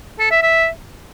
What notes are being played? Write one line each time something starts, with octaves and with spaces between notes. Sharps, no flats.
A4
E5
E5